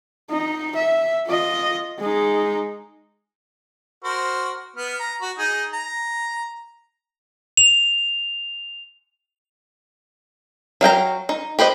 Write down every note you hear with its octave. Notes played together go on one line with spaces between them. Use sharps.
D#4
E5
F4 D#5
G#3 D#4
F#4 A#4 C5
B3 F6
A#5
F#4
D#4 G#4 D#5
A#5
F7
F#3 F5 G5 A#5
D#4
G4 B4 C5 D#5